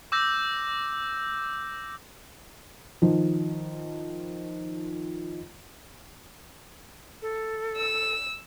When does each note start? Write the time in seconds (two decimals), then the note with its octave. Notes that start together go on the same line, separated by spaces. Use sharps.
0.12 D6 E6 G6 A#6
3.02 D#3 F3
7.22 A4
7.76 E6